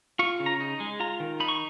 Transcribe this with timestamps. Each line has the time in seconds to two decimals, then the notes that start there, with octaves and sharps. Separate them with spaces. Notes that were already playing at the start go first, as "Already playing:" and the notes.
0.19 F4 C#6
0.40 C#3
0.46 A#5
0.60 D#4
0.80 G#3
1.00 F4 A#5
1.20 D#3
1.40 D#4 B5
1.48 C#6